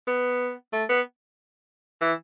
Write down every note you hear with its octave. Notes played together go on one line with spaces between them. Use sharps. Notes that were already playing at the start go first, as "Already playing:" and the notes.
B3
A3
B3
E3